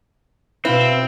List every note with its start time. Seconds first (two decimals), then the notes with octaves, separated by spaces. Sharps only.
0.65 B2 C4 E4 B4 F5